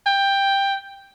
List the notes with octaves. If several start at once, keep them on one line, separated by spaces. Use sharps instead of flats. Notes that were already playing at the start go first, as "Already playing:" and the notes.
G5